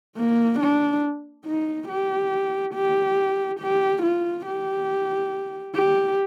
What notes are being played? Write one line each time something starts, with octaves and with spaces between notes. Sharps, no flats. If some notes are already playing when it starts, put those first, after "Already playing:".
A#3
D4
D#4
G4
G4
G4
F4
G4
G4